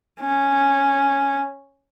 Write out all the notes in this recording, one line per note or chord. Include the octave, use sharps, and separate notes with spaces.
C#4